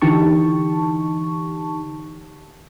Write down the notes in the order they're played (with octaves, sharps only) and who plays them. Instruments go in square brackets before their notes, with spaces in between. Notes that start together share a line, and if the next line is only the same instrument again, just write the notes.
[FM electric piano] D3 E3 D#4 G4 A5 C#6